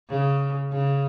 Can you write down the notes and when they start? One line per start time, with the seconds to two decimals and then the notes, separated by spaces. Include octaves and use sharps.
0.10 C#3
0.72 C#3